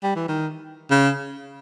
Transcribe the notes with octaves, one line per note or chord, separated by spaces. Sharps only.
G3
E3
D#3
C#3